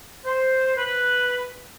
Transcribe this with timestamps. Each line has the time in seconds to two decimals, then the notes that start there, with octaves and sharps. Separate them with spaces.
0.25 C5
0.76 B4